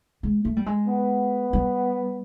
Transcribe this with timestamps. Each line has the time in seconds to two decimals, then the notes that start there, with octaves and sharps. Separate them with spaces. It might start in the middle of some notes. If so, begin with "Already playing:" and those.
0.23 G#3
0.45 A3
0.56 G3
0.66 G#3
0.88 B3
1.53 G3